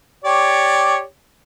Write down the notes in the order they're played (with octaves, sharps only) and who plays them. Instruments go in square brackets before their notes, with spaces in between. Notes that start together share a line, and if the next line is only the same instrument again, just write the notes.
[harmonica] G4 C#5 D5